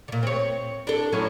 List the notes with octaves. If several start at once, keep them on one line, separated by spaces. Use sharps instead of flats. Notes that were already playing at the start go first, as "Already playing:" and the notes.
A#2 D3
C4 C#5
D4 A4
A2 F#3 C#4